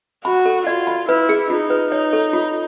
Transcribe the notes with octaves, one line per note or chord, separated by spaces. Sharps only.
F#4 B5
A4
F4 D5
B5
E4 B4
G#4
D#4 F4
B4
D#4 C#5
A4
F4